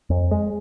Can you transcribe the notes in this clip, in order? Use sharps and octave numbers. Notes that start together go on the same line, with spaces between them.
F2
G#3